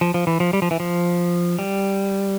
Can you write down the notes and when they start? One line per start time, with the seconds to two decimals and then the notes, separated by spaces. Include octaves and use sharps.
0.01 F3
0.14 F3
0.27 E3
0.40 F3
0.53 G3
0.62 F3
0.71 E3
0.80 F3
1.59 G3